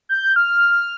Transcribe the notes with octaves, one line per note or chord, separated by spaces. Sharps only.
G6
F6